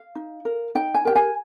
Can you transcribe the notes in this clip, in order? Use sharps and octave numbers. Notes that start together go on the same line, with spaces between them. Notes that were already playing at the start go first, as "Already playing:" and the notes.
Already playing: F5
D#4
A#4
D#4 G5
G#5
G4 A#4 G5
G#5